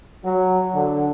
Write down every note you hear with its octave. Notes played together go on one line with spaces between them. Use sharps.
F#3
D3